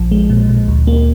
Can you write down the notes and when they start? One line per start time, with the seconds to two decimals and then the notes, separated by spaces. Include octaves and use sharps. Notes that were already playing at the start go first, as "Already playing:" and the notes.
Already playing: A#1 F3
0.11 G#3
0.30 A#2
0.49 A#2
0.68 D2
0.87 A#3